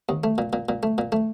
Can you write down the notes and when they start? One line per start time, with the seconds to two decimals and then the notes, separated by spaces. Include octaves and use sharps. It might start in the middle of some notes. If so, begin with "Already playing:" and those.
0.09 D#2
0.24 A3
0.38 A#2
0.53 A#2
0.69 A#2
0.83 A3
0.98 A#2
1.12 A3